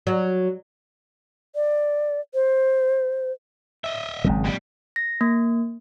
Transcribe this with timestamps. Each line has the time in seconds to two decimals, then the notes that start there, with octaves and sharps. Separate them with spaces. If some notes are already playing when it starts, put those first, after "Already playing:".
0.07 F#3
1.55 D5
2.34 C5
3.84 D#5 E5
4.24 G#1 G#2 C#3 F#3 G#3 C4
4.44 A#2 G3
4.96 A#6
5.21 A#3